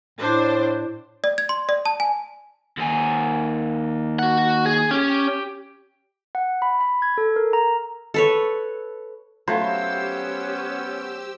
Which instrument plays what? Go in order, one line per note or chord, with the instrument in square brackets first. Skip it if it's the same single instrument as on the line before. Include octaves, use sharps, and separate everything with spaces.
[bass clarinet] A2 [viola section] D4 C5
[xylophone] D5
G#6
C6
D5
A5
G#5
[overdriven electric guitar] D#2 G#5
[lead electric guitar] F#4 F#5
G#4
[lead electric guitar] C#4 [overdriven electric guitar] G4
[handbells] F#5
B5
B5
G#6
A4
A#4
A#5
[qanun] A4 B4 C#5
[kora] F#3 A3 F4 [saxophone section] B3 C#4 [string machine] G4 E6 [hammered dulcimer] C5